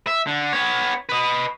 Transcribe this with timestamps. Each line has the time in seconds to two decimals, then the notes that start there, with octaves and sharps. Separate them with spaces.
0.07 E5
0.27 D3
0.53 B3 C#5
1.09 B4 D#5